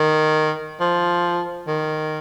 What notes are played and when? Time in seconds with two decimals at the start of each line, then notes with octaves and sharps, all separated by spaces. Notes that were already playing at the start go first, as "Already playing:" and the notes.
Already playing: D#3
0.80 F3
1.67 D#3